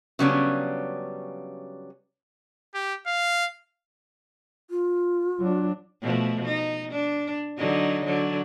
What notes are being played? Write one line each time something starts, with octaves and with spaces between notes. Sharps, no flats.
C#3 F#3 G3 B3 C#4 D4
G4
F5
F4
F#3 D4
B2 F3 A3
D#4
D4
D3 F#3 D#4
D3 F#3